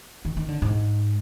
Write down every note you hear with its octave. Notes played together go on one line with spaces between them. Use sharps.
D#3
D#3
D3
G#2